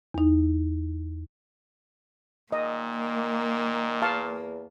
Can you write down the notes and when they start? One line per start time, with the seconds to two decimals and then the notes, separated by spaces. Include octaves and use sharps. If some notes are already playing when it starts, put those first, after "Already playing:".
0.14 E2 D#4
2.52 A#2 D#3 A#3 D#5
4.02 E2 F5 A5 C#6